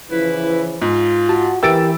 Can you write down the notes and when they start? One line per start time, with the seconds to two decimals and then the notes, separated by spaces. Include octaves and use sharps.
0.11 C#3 E3 F3 E4 B4
0.82 G#2 F4
1.29 F#4 A5
1.63 E3 G4 A#4 G5 E6 A6 D7